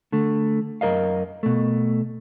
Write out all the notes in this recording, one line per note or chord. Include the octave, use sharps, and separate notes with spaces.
D3 A3
F#2 E3 A#4 D#5 F5
B2 A3